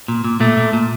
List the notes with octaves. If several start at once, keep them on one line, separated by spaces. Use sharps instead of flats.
A#2
A#2
A#2 A3
A#2
A#2